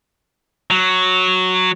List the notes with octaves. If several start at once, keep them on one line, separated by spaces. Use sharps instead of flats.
F#3